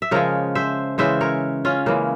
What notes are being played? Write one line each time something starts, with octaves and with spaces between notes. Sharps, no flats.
E5
C#3 F3 G#3 A#4 C#5
C5 E5
C#3 E3 G#3 C5 E5
A#4 C#5
C#4 F4
C#3 E3 G#3 A#3